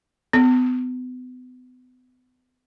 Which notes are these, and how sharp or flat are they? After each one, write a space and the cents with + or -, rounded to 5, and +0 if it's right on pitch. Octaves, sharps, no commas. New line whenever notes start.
B3 +35